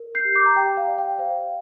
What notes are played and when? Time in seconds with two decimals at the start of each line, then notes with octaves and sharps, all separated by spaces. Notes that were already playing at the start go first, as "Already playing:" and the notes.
Already playing: A#4
0.15 G6 C7
0.25 G4
0.35 D6 G6
0.46 A#5
0.56 G4 G5
0.77 F5
0.88 D5
0.98 G5
1.18 C5 F5